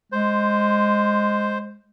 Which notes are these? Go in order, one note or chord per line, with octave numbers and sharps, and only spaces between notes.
G#3 C5